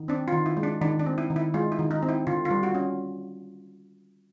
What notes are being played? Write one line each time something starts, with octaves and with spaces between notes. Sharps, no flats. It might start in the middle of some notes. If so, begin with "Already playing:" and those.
Already playing: D#3
C4 D4
D#3 F4
E4
G#3
D4
D#3 D4
D4
C4
E4
D#3
E4
G#3 F4
E4
D#3
D#4
C4
E4
D3 F4
F4
G3
F#4
C#4